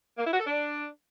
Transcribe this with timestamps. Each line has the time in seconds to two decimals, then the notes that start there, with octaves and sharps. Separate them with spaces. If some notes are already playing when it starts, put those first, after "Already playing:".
0.18 A#3
0.25 E4
0.32 F#4
0.39 A4
0.47 D4